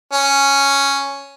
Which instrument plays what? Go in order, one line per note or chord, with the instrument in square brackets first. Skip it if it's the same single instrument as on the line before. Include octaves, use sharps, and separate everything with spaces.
[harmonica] C#4